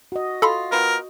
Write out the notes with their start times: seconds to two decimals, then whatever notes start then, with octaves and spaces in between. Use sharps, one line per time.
0.12 F#4 D#5
0.42 F4 A4 B5 C6
0.72 B3 F4 A#4 G5